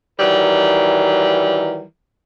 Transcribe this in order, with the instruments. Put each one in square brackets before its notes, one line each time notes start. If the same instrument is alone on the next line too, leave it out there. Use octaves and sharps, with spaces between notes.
[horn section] D#3 E3 F#3 G3 A#4